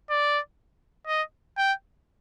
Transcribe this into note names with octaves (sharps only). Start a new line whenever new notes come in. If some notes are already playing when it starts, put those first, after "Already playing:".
D5
D#5
G5